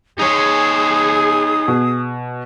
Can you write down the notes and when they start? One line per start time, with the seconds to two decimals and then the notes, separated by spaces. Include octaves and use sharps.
0.19 D#4 G#4 C#5 D#6
1.68 B2